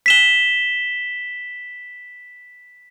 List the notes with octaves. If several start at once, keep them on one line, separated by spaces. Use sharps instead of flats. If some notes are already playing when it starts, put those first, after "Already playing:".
B6 E7 G7